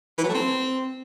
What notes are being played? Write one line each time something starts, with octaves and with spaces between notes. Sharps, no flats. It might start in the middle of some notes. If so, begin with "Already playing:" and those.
E3
F#3
A3
C4